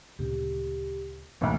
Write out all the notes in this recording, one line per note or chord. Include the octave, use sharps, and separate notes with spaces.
D2 A#2 C#3 G4
G#1 D2 B2 E3 G3 A3 A#3